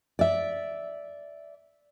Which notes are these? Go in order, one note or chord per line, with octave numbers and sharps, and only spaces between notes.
D5 E5